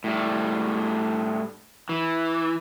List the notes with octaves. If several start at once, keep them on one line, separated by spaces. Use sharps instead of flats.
A2 G3
E3